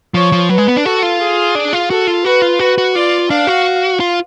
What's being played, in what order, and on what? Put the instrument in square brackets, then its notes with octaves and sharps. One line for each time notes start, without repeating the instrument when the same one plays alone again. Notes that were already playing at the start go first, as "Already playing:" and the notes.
[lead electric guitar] F3 [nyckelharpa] C#5
[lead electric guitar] F3
[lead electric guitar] F#3 [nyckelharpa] B4
[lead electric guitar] G#3
B3
D4
[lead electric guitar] F#4 [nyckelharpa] A4
[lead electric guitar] F4
[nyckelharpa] G#4
[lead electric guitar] D4
F4
[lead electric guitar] F#4 [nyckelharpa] A4
[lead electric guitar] F4
[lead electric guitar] F#4 [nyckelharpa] B4
[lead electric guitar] F4
[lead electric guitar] F#4 [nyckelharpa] B4
[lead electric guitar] F#4
[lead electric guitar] F4 [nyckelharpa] D5
[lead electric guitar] D4 [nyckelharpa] F5
[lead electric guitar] F#4
F4